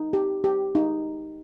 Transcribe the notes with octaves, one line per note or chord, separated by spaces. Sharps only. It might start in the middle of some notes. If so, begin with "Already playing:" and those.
Already playing: D#4
G4
G4
D#4